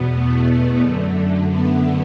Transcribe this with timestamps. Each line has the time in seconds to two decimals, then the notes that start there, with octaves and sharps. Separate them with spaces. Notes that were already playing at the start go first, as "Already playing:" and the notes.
Already playing: E2 B2 B3
0.14 A3
0.48 A3
0.81 F#2 D3
1.48 B3